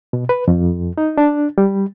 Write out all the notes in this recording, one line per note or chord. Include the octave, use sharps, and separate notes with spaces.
B2
B4
F2
D#4
D4
G3